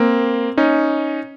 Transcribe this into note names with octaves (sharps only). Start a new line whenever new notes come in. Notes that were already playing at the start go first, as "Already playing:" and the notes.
Already playing: A#3 C4
C#4 D#4